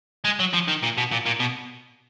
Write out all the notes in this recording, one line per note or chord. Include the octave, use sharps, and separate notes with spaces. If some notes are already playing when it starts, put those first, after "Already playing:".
G#3
F#3
F3
D#3
A#2
B2
A#2
A#2
B2